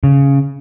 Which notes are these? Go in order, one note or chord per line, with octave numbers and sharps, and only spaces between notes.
C#3